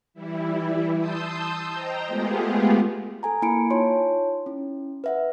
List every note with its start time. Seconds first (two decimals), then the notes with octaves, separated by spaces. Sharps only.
0.14 E3 G3 E4
0.96 A5 C6 D#6 E6 G6
1.71 C5 D#5 G5 A#5
2.07 G#3 A3 B3 F4 G4 G#4
3.23 A4 G#5 A#5
3.42 A#3 E4 G#5 B5 C#7 D7
3.70 D#4 F4 C#5 A5 C6
4.46 C#4 E4
5.04 B4 E5 F#5